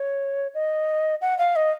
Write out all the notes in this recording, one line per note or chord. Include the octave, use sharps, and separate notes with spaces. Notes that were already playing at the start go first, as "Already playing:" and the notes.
Already playing: C#5
D#5
F#5
F5
D#5